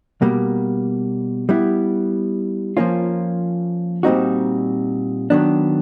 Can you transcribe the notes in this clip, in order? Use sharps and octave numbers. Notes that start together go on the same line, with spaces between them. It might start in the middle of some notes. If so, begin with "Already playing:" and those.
B2 G3 A#3
G3 B3 E4
F3 A#3 C#4 F4
A#2 G3 C4 D#4 F#4
D#3 F#3 B3 D4